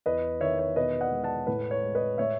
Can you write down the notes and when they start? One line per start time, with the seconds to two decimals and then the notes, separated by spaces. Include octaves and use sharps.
0.06 E2 B4 D#5
0.41 D#3 C#5 E5
0.59 C#5
0.76 B2 B4 D#5
1.01 D#5 F#5
1.11 G#3
1.24 F#5 A5
1.47 A2 B4
1.71 C#5
1.82 G#3
1.95 B4 D#5
2.18 A2 C#5 E5